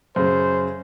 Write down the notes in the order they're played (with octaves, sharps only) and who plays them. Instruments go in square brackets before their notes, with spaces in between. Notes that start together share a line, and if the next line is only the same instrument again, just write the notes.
[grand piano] F#2 C#3 [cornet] C5